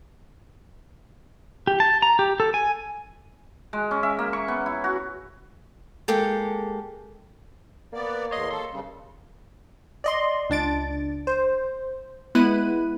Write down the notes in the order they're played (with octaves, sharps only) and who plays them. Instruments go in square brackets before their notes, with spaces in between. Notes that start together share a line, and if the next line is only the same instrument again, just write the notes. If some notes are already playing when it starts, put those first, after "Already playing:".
[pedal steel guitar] G4
A5
A#5
G4
A4
G#5
[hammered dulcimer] G#3
C#4
E5
A#3
C#6
B3
E4
F#4
[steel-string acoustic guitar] G#3 A#3 G4 A4
[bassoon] A#3 [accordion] B3 D5
[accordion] E2 C6 [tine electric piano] C#5 D#5
[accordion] A4 [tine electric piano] C6
[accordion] G2 C#3
[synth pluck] D5 D#5 C6
C#2 D4 A6 D7
C5
G#3 B3 E4 B5 F#6 D#7